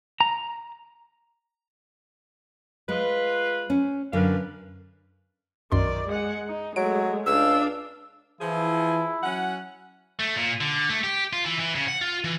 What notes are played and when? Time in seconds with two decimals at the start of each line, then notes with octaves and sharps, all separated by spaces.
0.21 A#5
2.89 G#3 F4 B4
3.70 C#4
4.13 F#2 D3 A#4 B4 F5
5.72 B1 F#2 D#3 D5 C6
6.08 G#3 F#5
6.48 D#4
6.76 F#3 G#3 A3 D7
7.26 C#2 D4 F5 E6
8.41 E3 F3 E4 G#4
9.23 F#3 C#4 F#5
10.20 A3
10.36 A#2
10.61 D3
10.89 A3
11.04 G4
11.33 F4
11.45 E3
11.60 E3
11.75 C#3
11.88 F#5
12.01 F4
12.24 E3